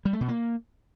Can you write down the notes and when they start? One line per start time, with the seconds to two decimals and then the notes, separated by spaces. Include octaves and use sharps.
0.05 G3
0.13 A3
0.21 B2
0.28 A#3